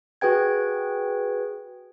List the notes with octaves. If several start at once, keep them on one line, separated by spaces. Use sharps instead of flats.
F#4 G#4 B4 G5 G#6